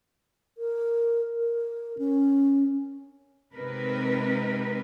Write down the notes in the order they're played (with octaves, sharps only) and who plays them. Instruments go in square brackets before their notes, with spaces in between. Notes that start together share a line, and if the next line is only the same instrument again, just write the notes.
[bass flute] A#4
A#4
C#4
[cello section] C3 G#3 C4 D#4 A#4 B4